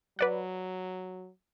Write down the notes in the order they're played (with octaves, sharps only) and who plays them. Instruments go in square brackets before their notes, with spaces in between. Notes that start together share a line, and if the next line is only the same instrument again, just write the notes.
[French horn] F#3 [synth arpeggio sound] B4 D5 F#5